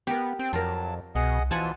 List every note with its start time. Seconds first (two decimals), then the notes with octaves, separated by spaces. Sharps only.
0.07 B3 G4 A#4
0.39 C4 G5
0.53 F2 F#3 F4 A#4 A5
1.15 C2 B2 G#4 D#5 F#5
1.51 B2 E3 F3 F4 F#5 G#5 A5